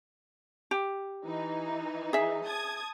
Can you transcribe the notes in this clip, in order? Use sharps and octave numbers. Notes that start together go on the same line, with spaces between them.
G4
E3 D#4
G#4 E5
A5 D#6 G#6